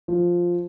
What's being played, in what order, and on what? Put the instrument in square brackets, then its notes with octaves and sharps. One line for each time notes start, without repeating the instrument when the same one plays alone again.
[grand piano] F3